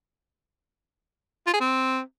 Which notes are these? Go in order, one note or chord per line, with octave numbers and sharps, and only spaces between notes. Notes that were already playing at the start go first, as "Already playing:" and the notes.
F4
G#4
C4